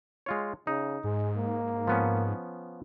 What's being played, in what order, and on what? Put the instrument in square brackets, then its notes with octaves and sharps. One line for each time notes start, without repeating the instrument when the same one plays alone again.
[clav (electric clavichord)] G#3 F4 C#5
[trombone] C#3 [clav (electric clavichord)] D#4
[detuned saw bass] G#2 [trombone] G#3
[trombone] A#3
[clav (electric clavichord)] F3 B3 C#4